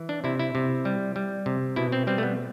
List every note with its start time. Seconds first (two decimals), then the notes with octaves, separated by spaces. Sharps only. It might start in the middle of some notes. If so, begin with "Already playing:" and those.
Already playing: E3
0.09 D4
0.24 C3 E4
0.39 E4
0.55 C3
0.85 G3
1.16 G3
1.46 C3
1.76 B2 E4
1.92 C4
2.07 G3 C4
2.18 A3
2.23 B3